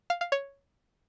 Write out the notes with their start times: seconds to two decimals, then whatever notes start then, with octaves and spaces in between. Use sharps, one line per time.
0.10 F5
0.21 F5
0.32 C#5